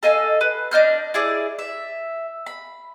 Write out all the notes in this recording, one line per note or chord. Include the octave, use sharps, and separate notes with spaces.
A4 D#5 F5 G#5
B4
D4 D#5 F6 G6
E4 G#4 D5
E5
B5